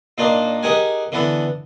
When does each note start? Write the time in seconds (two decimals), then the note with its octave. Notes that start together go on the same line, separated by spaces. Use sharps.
0.18 A#2 A#3 D4 D#4 F4
0.63 D#4 G4 G#4 A#4 F#5 G#5
1.12 D3 E3 B3 A4 B5